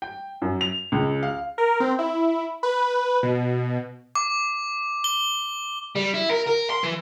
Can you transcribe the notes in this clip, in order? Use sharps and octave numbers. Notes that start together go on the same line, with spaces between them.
G5
F#2
F7
C#2
F5
A#4
C4
E4
B4
B2
D6
G7
G3
E4
A#4
A#4
C6
E3